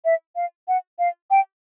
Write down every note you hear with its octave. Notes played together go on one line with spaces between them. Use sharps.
E5
F5
F#5
F5
G5